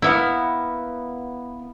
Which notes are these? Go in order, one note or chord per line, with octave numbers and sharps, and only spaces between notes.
A#3 B3 E4 F6